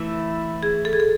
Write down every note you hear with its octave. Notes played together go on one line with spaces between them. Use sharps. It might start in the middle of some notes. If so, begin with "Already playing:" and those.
Already playing: E3 A3 E4
G#4
A4
G#4
A4